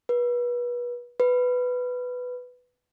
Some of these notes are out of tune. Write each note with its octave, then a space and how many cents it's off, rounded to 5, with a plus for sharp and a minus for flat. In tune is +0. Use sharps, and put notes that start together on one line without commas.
B4 -30
B4 +5